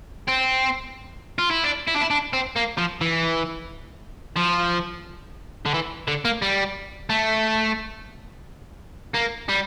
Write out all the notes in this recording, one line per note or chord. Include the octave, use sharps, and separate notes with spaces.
C4
F4
E4
D4
E4
D4
E4
D4
C4
A#3
F3
E3
F3
D3
E3
D3
A#3
G3
A3
A#3
G3